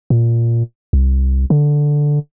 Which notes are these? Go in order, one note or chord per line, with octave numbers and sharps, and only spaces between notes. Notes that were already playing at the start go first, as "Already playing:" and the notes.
A#2
C2
D3